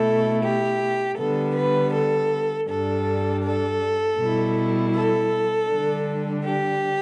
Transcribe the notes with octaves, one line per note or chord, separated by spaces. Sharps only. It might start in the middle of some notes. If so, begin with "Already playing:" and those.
Already playing: B2 A3 E4 A4
G4
D3 G3 B3 A4
B4
A4
G2 G3 D4 A4
A4
B2 G3 E4
A4
D3 G3 D4
G4